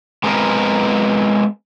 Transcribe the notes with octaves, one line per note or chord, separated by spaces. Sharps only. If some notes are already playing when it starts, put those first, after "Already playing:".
G#3 B3 C4 A#4 B4 D#5